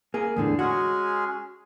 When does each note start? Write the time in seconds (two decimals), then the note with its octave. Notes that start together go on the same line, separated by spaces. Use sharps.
0.14 A#3 G#4
0.36 E2 A2 D3 G#4
0.59 G#3 C#4 F#4 G#4